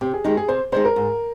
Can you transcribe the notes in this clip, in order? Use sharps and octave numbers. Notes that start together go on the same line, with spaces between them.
C3 G4
G#4
D#3 G#3 D#4 G4
G#4
C3 C5
D#3 G#3 D#4 C5
A#4
G#2